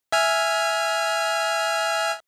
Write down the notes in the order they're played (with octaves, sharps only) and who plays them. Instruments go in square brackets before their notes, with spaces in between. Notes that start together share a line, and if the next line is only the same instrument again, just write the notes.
[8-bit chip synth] E5 G#5 F6